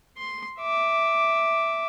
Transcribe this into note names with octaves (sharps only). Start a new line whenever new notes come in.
C6
E5 D6